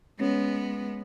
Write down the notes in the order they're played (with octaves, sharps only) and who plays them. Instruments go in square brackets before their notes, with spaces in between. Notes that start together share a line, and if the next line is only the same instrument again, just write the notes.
[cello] G#3 B3 [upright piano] C#4